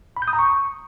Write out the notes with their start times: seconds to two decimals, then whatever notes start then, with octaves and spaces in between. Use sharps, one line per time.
0.17 B5
0.22 G6
0.28 D#6
0.33 A#5
0.39 C#6